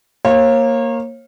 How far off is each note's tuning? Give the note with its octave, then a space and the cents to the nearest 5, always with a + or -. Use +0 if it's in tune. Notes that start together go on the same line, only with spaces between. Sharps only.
A#3 +0 C#5 -35 F5 +0